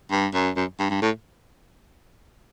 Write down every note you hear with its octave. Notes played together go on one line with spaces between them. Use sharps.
G2
F#2
F#2
G2
G2
A2